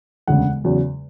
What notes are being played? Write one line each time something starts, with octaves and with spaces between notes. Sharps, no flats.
E1 D2 C#3 F#5
E2 C#3 F#3